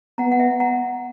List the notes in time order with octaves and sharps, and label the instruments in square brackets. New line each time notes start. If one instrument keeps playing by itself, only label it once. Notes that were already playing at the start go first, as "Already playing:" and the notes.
[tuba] B3 [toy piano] F#5 A#5
[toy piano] F#5
E5 G5
F#5 A#5